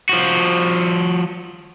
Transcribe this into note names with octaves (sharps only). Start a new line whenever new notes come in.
F3 F#4